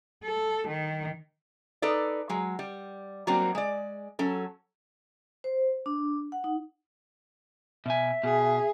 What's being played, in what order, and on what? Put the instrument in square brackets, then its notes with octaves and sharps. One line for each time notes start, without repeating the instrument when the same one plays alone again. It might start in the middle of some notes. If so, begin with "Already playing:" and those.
[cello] A4
D#3
[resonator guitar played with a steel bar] D#4 A4 B4 D5
F#3 G#3
G3
F#3 G3 A#3 C4 D4 F#4
G#3 D5
F#3 C#4 A4
[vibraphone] C5
D4
F#5
D#4
[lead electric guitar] B2 G#5 [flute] E5
[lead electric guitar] B2 [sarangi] G#4